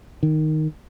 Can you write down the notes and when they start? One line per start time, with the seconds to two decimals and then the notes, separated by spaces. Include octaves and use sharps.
0.23 D#3